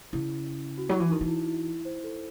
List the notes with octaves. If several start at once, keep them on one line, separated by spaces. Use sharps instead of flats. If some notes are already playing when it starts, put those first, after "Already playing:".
C#3 E4
F#4
F#3 E4
E3
D#3 D#4
E3
E4
E4
E4
C5
A4